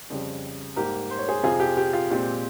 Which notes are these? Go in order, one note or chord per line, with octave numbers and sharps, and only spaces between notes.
F2 C#3 G3
G#2 G3 A#3 G4 A#4
C5
C#5
G#4 C5
F2 C3 F3 C4 F4 G#4
G4
G4
F4
A#2 G#3 C4 G4